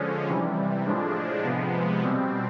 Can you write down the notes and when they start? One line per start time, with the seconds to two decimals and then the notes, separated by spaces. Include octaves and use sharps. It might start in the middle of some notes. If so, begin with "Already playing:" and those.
Already playing: D3 F3 G#3 C#4
0.28 C3 E3 G3
0.86 A2 F3 G#3 D4
1.44 C3 F3 G#3 B3
2.03 B2 G3 C4